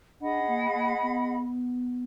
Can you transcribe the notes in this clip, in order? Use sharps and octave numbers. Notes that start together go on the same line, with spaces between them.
D4 G#4 D#5 F#5 B5
A#3
A#3
B3